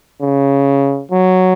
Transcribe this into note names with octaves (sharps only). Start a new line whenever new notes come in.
C#3
F#3